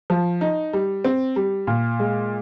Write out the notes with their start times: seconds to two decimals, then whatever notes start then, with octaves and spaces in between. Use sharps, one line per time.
0.10 F3
0.41 D#4
0.73 G3
1.05 C4
1.36 G3
1.67 A#2
2.00 G#3